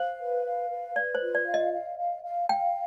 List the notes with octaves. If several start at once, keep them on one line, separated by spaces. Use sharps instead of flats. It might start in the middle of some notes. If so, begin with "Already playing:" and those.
Already playing: C5 F5
B4
F5
B4
B4 D5
C5
F4
D5
F5
D#5
F5
F5
F5
F5 G5